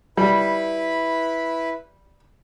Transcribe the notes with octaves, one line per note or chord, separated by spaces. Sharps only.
G3 E4 B4 B5